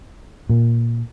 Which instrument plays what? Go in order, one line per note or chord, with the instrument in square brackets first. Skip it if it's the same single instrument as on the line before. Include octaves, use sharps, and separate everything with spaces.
[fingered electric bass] A#2